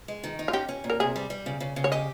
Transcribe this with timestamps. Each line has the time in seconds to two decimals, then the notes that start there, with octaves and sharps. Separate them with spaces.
0.08 G#3
0.24 D#3
0.39 D#4
0.48 F4
0.53 C#4 G4
0.69 C#4
0.84 A#2
0.90 A#4
1.00 C3 G#4
1.16 G3
1.30 G3
1.46 C#3
1.60 C#3
1.76 C#3
1.84 C#5
1.92 G4 D#5